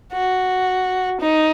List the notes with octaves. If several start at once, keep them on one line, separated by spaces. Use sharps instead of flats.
F#4
D#4